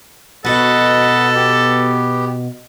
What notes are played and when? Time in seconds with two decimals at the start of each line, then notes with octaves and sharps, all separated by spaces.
0.45 B2 F#4 A4 B4 D#5 F#5
1.35 B3 G4